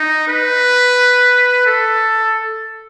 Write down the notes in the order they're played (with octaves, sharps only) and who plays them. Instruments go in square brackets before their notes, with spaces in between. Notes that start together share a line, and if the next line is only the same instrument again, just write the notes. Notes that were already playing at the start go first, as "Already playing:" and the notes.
Already playing: [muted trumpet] D#4
B4
A4